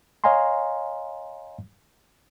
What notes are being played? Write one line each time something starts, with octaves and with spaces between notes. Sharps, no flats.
C#5 D#5 F5 G#5 A#5 C6